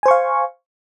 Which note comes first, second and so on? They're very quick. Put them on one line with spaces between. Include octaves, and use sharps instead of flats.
G#5 C5 C#6 F5